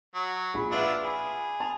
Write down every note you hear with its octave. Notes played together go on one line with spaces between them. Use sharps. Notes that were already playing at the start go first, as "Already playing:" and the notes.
F#3
A#1 G#4 B5
D4 E4 F4 B4 E5 F#5
G#4 B5
A5 F7